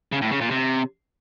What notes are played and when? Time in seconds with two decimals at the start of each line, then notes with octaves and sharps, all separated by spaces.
0.12 C#3
0.22 A2
0.31 C#3
0.41 A#2
0.50 C3